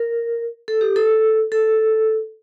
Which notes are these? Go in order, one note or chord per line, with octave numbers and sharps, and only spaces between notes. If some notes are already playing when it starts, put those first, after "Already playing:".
Already playing: A#4
A4
G4
A4
A4